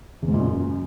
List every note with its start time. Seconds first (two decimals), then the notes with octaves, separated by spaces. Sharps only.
0.22 E2
0.28 G#2
0.34 A#2
0.39 F#2